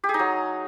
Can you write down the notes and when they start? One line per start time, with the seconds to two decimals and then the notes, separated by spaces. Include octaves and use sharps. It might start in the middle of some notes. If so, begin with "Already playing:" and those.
0.04 G4
0.09 G#4
0.14 D#4
0.19 F#3